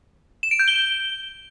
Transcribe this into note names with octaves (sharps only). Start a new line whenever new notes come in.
E7
D7
G6
G7